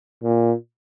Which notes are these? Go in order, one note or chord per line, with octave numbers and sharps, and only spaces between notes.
A#2